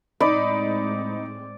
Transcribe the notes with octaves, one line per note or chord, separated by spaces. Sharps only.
A2 G#3 C4 D#4 D5 B5